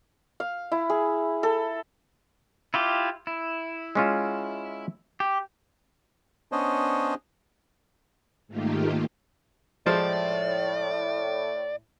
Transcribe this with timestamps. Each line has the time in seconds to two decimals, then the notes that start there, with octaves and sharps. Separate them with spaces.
0.40 F5
0.72 E4
0.90 G#4
1.43 A4
2.74 E4 F4 G4
3.27 E4
3.95 G#3 C#4 F4
5.20 G4
6.52 B3 C#4 D4 C5 C#5 D#5
8.48 G#2 D#3 A3 A#3 F4 G4
9.86 A2 F3 G#3 C5 D5